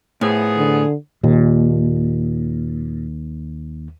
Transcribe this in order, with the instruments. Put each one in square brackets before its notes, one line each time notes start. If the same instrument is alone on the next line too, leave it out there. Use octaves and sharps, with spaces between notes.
[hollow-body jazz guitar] A2 [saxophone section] F3 B3 G#4
[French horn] D3
[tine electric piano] D#2 [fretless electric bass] A#2